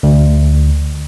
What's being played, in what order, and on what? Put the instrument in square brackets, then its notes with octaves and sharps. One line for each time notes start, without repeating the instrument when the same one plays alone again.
[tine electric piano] D2